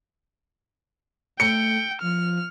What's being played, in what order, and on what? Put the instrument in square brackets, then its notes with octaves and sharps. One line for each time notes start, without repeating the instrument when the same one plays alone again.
[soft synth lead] A3 [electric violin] G5 [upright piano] C#7
[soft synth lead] F3 [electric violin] F6